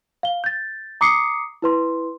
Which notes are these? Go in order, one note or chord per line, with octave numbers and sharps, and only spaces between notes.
F5 G7
G6 A6
A#5 D6 D#6 C7 C#7
E4 B4 C6